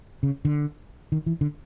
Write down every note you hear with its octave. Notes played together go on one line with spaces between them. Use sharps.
C#3
D3
D#3
E3
D3